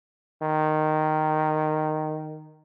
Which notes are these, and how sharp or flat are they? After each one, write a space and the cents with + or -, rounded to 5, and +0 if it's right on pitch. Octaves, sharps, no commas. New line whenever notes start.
D#3 -10